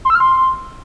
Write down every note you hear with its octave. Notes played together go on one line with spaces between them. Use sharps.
C6
E6
F6
C6